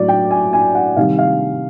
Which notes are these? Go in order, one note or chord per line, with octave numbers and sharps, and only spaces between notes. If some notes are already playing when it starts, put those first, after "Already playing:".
Already playing: A2 F#3 D5
G5
G#5
G#5
F#5
C3 D#3 G3 F5
F5